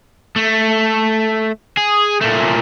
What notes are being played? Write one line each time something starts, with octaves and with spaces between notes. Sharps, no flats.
A3
G#4
A#2 A3